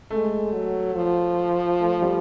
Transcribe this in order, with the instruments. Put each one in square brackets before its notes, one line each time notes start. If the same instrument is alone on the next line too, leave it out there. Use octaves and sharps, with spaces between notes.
[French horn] G#3 [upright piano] A3
[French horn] F#3
F3
[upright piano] A3
G3